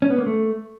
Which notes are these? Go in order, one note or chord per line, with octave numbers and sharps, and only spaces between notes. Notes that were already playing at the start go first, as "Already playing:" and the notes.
C#4
B3
A#3
A3